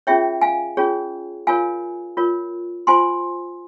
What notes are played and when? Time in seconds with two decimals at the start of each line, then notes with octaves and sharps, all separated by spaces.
0.07 C#4 F4 G#4 C#5 E5 G5
0.41 F5 G#5
0.77 C#4 F4 G#4 C#5
1.47 F4 A#4 C#5 F5 G#5
2.17 F4 A#4 C#5
2.87 F4 C5 G#5 C6